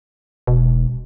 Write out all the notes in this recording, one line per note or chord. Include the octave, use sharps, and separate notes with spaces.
E1 B2